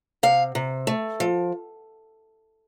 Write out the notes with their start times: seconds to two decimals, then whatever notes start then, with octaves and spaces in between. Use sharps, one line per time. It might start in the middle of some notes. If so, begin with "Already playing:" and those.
0.23 C3 F5
0.55 C3
0.87 A3
1.20 F3